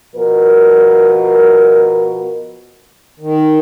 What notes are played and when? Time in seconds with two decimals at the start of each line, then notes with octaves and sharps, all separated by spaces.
0.16 B2 F3 A#4
3.20 D#3